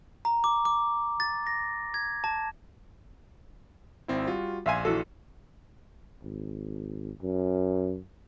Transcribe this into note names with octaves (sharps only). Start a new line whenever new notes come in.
A#5
D6
D6
A6
A#6
G#6
A5
G#1 C4 E4
G3 F4 F#4
A#1 E5 F5 G#5 C6 D#7
E3 F#4 A4
G#1
F#2